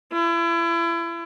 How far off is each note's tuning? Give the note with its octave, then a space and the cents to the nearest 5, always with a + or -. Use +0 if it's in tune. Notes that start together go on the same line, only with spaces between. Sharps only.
E4 +35